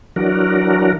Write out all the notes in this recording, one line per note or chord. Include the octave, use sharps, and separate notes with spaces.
E3 F#3 D4 F#4 A#4